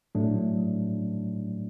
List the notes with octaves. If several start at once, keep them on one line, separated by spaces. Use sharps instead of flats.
A2 F#3 A3 D4